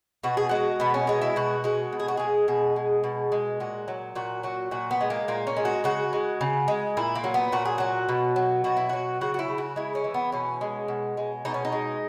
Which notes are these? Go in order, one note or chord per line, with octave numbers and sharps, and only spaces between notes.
B2 F#4
G#4
G#3 F#4
B2 B3
C#4
G#3 D#4
E4
B2 F#4
G#3 F#4
B2
G#4
F#4
G#3 G#4
B2 G#4
G#3
B2
G#3
A#2 F#4
F#3
A#2 F#4
F#3 F#4
A#2 F#4
B3
G#3
A#3
A#2 A#3
C#4
G#3
F#4
C#3 F#4
G#3
C#3
G#3
A#2 E4
A#3
F#3
B3
A#2 F#4
G#4
F#3 F#4
B2
F#3
B2 F#4
E4
F#3 F#4
C#3 F#4
F#4
E4
C#3
F#4
G#3 E4
C#4
E3
B3
B2 C#4
G#3
B2
G#3
B2 D#4
C#4
D#4
G#3